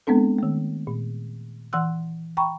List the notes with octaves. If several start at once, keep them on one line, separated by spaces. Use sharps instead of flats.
G#3 B3 C4 D4 A4
D#3 A3
A#2
E3 F#5 C6 E6 F#6
G5 A#5 B5 C#6